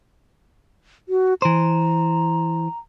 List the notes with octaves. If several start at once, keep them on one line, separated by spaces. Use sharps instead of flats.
F#4
E3 C5 A#5